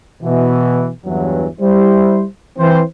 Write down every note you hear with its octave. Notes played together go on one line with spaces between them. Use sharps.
B2 E3
E2 G2 E3 F#3
G3 E4 C5
E3 C4 C5